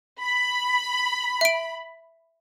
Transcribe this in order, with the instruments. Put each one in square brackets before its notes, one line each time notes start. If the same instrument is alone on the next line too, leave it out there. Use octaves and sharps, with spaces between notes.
[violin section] B5
[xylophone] E5 D7